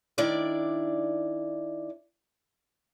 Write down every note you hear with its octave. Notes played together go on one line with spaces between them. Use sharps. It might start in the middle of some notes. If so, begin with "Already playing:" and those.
D#3 D4 E4 D5